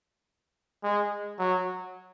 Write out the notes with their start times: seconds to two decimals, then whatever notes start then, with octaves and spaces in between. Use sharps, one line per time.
0.84 G#3
1.39 F#3